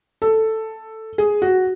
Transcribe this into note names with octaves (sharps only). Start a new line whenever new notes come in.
A4
G#4
F#4